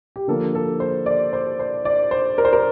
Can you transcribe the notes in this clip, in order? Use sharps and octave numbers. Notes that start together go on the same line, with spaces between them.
G4
D3 F3 A#3 A4
A4
C5
D5
C5
C5
D5
C5
A#4
C5
A#4